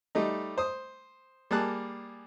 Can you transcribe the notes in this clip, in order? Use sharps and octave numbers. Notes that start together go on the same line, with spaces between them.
G3 A3 D#4
C5 D#6
G3 A#3 G#4 A5 F#6